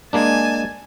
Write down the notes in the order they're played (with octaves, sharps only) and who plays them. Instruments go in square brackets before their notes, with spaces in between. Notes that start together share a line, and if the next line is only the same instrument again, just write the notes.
[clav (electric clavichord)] G#3 A#3 D4 [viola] G#5 A5